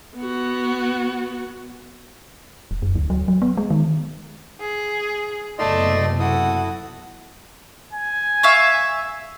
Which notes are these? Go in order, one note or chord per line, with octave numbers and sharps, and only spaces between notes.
B3 F#4
E1
F#2
D2
F#3
F#3
B3
G#3
D#3
G#4
F#1 C3 A3 B3 D5 D#5 C6
E4 F#4 A4 D#6
G#5
E5 F5 C#6